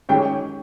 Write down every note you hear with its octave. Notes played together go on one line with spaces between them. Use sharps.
D#3 G#3 C#4 G4 C#5 G5